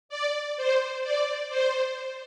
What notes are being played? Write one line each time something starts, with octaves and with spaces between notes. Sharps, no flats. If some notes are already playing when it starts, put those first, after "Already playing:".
D5
C5
D5
C5